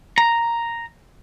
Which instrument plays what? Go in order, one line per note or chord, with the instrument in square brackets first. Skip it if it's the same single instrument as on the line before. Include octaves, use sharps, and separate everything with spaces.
[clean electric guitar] A#5